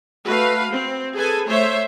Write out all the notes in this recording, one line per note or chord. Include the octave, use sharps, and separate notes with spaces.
A3 F#4 B4 F5
C4
G#4 A4 B4 G#5
A3 C5 C#5 E5